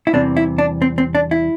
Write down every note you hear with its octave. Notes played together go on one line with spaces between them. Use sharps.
E4
E2 C3 E3 G3 C4 D4
E4
D4
C4
C4
D4
E4